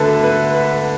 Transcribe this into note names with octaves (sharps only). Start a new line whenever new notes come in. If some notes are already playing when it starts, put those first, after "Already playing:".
Already playing: D2 D3 A3 A4 B4 E5
B4
B4